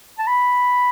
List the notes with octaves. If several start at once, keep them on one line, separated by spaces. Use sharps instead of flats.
A5
B5